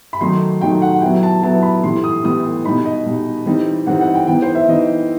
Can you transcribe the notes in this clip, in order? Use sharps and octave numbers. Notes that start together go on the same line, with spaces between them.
B5
D#3 F#3 A3 D#4 C6
D#3 F#3 A3 D#4 G5
F#5
F#3 B3 E4 G5
A5
F#3 B3 E4 A5
B5
A2 E3 G3 B3 C6
D#6
A2 E3 G3 B3 D#6
B2 G3 D#4 B5
D#5
B2 G3 D#4
E3 G3 C4 D#4
E3 G3 C4 D#4 F#5
F#5
G5
E3 B3 D#4 G5
C5
E5
E3 B3 D#4 D#5